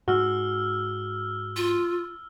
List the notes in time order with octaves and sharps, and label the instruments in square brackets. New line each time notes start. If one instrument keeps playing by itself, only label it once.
[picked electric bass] G#2 G#3 [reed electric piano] F#4 [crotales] E6 F6 G7
[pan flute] F4